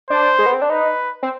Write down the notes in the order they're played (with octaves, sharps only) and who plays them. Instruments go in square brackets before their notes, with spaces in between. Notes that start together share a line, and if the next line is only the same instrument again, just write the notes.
[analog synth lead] D4 [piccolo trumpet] C5
[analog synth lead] G#3
B3
C4
D4
[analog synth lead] D#4 [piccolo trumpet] B4
[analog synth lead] C4